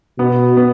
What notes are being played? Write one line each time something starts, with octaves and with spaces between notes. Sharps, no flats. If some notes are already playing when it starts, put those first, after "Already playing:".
B2 B3
B3